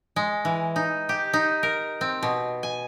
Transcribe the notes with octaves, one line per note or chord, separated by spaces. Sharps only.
G#3
E3
D#4
G4
D#4
A#4
C4
B2
G#5